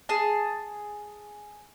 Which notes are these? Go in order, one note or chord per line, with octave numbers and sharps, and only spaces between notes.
G#4 A5